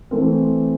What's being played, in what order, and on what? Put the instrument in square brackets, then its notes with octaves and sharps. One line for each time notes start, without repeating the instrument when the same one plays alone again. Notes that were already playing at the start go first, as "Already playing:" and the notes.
[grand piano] E3 A3 C4